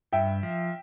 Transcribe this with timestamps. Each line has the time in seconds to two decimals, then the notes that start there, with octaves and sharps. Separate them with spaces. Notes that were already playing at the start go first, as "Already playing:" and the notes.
0.13 G2 E5 G5
0.43 F3